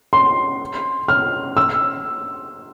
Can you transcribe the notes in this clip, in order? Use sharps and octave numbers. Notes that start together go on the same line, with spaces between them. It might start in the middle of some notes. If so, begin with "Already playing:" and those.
C6
F6
E6